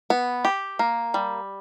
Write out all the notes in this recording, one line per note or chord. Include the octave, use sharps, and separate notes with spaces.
B3
G4
A#3
G3